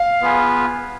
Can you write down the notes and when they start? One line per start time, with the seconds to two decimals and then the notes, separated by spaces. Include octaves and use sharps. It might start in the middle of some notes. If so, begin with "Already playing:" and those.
Already playing: F5
0.21 B3 F4 G#4 B4